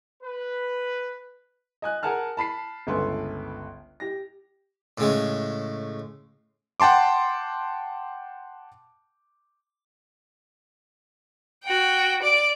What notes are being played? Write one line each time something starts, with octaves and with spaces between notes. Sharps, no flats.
B4
D#5 G#5 F#6
G#4 A#4 F#5 G#5 A5 F6
A5 B5 B6 C7
G1 C#2 A4 B4 G#5 C6
G4 A#6
A2 C#3 G#3
F#5 G5 A5 C6 D6
F#4 G5
D5 D7